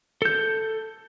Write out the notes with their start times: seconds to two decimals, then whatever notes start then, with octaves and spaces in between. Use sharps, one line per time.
0.22 A4 G6